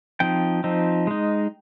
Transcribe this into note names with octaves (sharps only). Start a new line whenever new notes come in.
F3 C4 D#4 G5
F3 C4 D#4
G#3 D#4